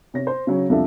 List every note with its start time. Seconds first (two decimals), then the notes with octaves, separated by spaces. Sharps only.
0.14 C3 C#5 A#6
0.27 C5
0.47 C#3 F#3 C#4
0.69 C2 F2 F3 D4 A4 E5